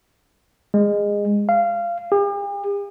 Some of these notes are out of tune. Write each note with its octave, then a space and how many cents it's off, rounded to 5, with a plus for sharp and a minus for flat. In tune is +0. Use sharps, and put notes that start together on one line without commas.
G#3 -20
F5 -20
G4 +45